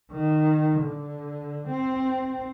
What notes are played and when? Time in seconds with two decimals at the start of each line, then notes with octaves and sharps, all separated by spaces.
0.12 D#3
0.81 D3
1.68 C4